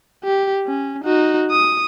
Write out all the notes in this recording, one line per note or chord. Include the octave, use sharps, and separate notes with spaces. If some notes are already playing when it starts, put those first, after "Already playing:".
G4
C#4
D#4 F#4
D#6